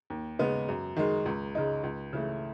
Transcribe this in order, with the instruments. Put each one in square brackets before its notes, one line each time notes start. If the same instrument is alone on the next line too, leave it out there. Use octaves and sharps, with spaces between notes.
[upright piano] D#2
C#3 G#3 B3 D#4
F#2
D#3 G#3
C#2
C#3 G#3 D#4
C#2
C#3 E3 A3